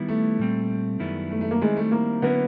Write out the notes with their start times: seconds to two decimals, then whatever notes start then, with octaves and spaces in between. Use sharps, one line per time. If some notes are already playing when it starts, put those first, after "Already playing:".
Already playing: D#3 G3 B3 E4
0.09 A3
0.39 A#2 G3 C4
1.00 F#2 D#3 G3 B3 E4
1.31 A3
1.41 A3
1.51 A#3
1.61 D#3 G3 G#3 C4 E4
1.77 A3
1.92 A#3
2.22 D3 F#3 A#3 B3 C#4 E4